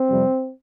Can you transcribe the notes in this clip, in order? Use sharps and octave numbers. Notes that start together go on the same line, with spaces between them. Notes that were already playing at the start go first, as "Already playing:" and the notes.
Already playing: C4
F2 C3 G3